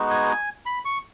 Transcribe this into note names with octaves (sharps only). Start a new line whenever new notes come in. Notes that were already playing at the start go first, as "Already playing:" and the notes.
Already playing: G#3 B3 D#4 F#4
G#5
B5
C#6